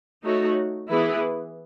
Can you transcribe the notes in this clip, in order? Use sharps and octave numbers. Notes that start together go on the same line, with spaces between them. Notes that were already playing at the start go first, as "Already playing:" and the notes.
A3 D#4 F#4 C#5
E3 B3 E4 G#4 B4